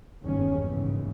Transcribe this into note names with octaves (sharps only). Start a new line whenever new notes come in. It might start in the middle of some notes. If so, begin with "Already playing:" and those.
F#1 E2 G2 D#3 C#4
A#1 G#2 C#3 E3